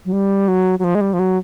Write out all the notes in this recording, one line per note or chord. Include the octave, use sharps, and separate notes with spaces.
F#3
G3
F#3
F#3
F3
G#3
G3
F3
F#3